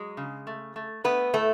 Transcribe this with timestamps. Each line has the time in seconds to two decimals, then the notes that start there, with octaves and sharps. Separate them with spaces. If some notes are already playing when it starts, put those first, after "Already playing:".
Already playing: F#3 G#3
0.17 C#3
0.47 A3
0.76 A3
1.04 A3 B3 B4
1.33 A2 A3 A4